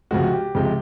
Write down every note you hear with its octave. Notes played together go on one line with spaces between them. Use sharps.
C#2 C3 F3 G#3 F#4
G4
C#2 C3 F3 G#3